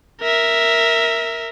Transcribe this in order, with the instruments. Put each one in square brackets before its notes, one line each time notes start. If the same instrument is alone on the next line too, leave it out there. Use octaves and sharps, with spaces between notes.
[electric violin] A#4 E5